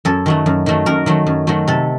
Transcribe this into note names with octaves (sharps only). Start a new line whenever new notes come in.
F#2 A4
D#3 F#3 A3
F#2
D#3 F#3 A3
F#2 A#4
D#3 F#3 A3
F#2
D#3 F#3 A3
C3 A4